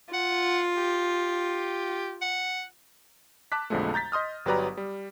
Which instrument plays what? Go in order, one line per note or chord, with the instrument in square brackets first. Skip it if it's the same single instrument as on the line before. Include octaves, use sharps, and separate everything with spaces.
[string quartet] F4 [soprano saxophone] F#5
[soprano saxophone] G4
F#5
[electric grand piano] A5 D6 F#6 B6
B1 F2 D3 F3 G#3 A3
A#5 G6 A6 B6
D#5 C6 D#6 F6
G1 F#3 G4 B4 D5 A#5
G3